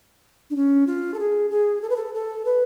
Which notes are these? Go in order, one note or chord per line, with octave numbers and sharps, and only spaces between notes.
D4
C#4
F4
A4
G#4
G#4
A4
B4
A4
A4
B4